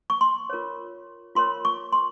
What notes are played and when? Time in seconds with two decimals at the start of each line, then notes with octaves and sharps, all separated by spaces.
0.10 C#6
0.21 C6
0.50 F4 A#4 C#5
1.35 F4 A#4 C#5 C6
1.65 C#6
1.93 C6